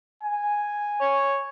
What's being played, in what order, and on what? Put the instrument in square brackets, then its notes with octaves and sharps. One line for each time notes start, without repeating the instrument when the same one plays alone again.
[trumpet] G#5
[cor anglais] C#5